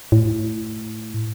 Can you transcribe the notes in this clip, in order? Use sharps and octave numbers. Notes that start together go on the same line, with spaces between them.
A2